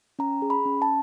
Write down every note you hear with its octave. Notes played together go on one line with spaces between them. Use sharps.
C#4 A#5
G#4
B5
C#4
A5